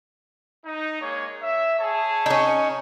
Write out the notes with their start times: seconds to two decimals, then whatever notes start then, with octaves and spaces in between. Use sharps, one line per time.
0.65 D#4
1.00 G#3 A#3 C#5
1.42 E5
1.79 G#4 C#5 A5
2.26 C#4 D#4